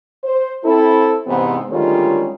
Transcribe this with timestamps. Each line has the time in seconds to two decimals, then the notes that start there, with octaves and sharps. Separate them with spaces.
0.24 C5
0.65 C4 E4 A4
1.27 E2 G#2 C3 B3 C4
1.70 D2 D#3 G3 G#3 C#4 F4